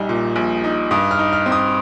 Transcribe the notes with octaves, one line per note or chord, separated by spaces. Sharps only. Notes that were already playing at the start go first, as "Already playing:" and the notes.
Already playing: A#1 G3 D#4
A#2
A#1
D#4
G2 D#6
F6
D#4
F6
C4
D#6